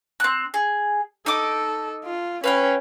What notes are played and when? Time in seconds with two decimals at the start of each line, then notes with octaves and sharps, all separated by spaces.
0.20 C4 F#6
0.54 G#4
1.26 D#4 A4 D#5 D6
2.05 F4
2.44 C#4 B4 F5 G5